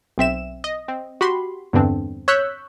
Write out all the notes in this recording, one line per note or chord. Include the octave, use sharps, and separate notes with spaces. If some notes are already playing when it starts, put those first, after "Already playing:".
B1 C4 E5 E7
D#5
C4
F#4 G4 B5 C6
E2 G2 D3 C4 D4
C#5 C#6 E6 F#6 G6 B6